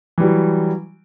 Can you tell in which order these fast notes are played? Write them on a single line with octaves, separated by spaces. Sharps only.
E3 G3 F#3